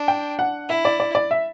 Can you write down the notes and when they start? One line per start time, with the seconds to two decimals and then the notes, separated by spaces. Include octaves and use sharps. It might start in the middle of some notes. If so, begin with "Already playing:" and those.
Already playing: D4
0.08 G5
0.39 F#5
0.69 E4 E5
0.85 D5
1.00 D5
1.15 D5
1.31 E5